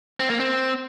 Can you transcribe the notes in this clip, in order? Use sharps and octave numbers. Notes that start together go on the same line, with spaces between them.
C4
A#3
C4